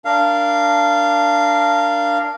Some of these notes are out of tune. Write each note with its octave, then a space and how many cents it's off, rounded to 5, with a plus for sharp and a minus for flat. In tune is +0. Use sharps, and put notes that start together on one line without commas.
D4 +0 A#4 +0 F5 -15